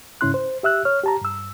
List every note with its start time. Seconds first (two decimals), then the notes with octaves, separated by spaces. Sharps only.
0.21 G#2 C#3 C#4 E4 C6 F#6
0.34 C5
0.63 G4 E5 E6 F#6
0.85 C#5 F6
1.04 G4 A5 A#5
1.21 G2 E6